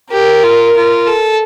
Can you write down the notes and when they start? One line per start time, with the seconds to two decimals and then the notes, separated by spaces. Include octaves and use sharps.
0.12 G4 A#4
0.44 F4
0.76 F4
1.07 A4